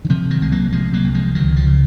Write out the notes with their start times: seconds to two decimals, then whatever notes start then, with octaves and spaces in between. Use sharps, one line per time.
0.05 D#3
0.10 C3 F3
0.30 D#3 F#3
0.41 C2 G#3
0.52 F#3 A#3
0.72 C3 F3 G#3
0.93 F#3 A#3
1.04 C2
1.14 F3 G#3
1.35 C#2 D#3 F#3
1.56 F3
1.66 C#3